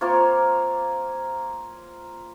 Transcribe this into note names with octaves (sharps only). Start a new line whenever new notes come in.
A#3 C4 F4 C#5